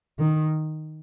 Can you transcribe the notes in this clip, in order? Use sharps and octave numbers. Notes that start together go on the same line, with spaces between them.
D#3